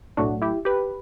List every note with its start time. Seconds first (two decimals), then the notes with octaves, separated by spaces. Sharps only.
0.17 B1 A2 F#3 A3 D4 F#4
0.42 E4 G4
0.65 G4 B4